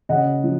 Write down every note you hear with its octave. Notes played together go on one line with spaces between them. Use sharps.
C#3 D#5 F#5
F3